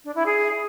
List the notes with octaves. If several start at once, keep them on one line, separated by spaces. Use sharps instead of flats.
D4
E4
G#4